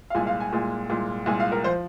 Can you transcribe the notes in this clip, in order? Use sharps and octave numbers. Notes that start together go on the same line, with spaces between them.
F5
C2 A#2 G#3 G#5
F5
G#5
C2 A#2 G#3
C2 A#2 G#3
C2 A#2 G#3 G#5
F5
A#4
F3 C5